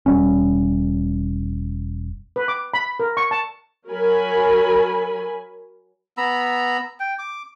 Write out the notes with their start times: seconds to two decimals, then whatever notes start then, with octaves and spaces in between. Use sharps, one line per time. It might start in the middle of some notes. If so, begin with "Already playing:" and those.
0.06 E1 G3 C#4
2.36 B4
2.48 D6
2.74 B5
3.00 A#4
3.17 C#6
3.31 A5
3.88 F#3 A#4 G#5 B5
6.17 B3 A#5 B5 E6
7.00 G5
7.19 D6